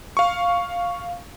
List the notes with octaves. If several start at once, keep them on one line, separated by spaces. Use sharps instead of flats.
F5 C#6